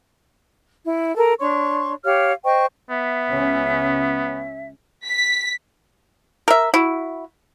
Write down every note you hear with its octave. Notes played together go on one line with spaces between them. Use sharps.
E4
A4 A#4
D4 C#5 C6 C#6
G4 C#5 F5 F6
C5 D#5 G5 C#6
B3 E5
C#2 C#3 C#4
B6
A#4 E5
E4 F#4